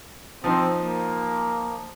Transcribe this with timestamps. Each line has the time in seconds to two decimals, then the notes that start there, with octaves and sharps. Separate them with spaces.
0.44 F3 C4 D#4 C5
0.79 A#3